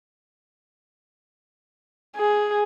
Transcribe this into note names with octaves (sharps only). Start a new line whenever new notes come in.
G#4